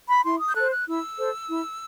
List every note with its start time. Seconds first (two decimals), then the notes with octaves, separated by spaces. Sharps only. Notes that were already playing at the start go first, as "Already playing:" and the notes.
0.09 B5
0.24 E4 C6
0.40 D#6
0.48 G6
0.55 A4 C5 F#6
0.71 F#6
0.87 E4 E6
1.17 A4 C5
1.49 E4